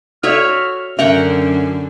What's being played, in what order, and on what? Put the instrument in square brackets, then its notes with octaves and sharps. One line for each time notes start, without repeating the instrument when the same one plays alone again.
[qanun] F#4 C#5 E5 [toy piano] A4 D5 [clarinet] F6
[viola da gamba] F#2 D3 [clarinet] C#4 [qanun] A#4 F#5 G5 [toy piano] E5